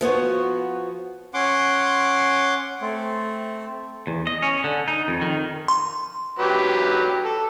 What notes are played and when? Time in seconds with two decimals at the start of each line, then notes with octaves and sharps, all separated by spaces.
0.01 F3 B3 F#4 C#5
1.34 C#4 F#5 C6 D6
2.81 A3 C4
4.07 E2
4.27 D#5
4.42 C#4
4.64 D3
4.88 D#4
5.08 F2
5.21 D#3
5.68 C6
6.39 F#3 G4 B4
7.25 A4